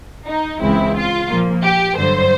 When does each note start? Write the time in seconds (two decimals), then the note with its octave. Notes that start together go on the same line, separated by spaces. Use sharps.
0.26 D#4
0.60 C#2 C#3 E3 G#3 C4 E4
0.95 F4
1.29 A#2 F3 A#3
1.63 G4
1.97 G2 D3 F#3 C5